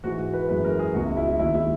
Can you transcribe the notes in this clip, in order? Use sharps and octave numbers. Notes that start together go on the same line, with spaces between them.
G#2 E3 G#3 F#4
F#4
B4
F#2 E3 G#3 B4
A#4
G#4
C#2 B2 G#3 F#4
E4
E4
E4
D#2 D#3 G#3 E4
E4